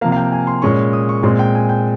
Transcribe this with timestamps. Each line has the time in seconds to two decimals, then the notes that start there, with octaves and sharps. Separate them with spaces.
0.01 C3 F3 A#3 F5
0.12 F5
0.16 G5
0.32 G#5
0.47 C6
0.62 A#2 G#3 C#4 C#6
0.93 D#6
1.09 C#6
1.23 A#2 G#3 C4 C6
1.39 G5
1.55 G#5
1.69 G5